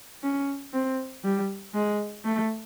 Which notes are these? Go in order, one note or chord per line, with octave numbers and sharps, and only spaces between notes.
C#4
C4
G3
G#3
A3